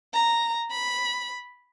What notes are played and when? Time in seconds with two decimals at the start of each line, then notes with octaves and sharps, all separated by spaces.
0.14 A#5
0.70 B5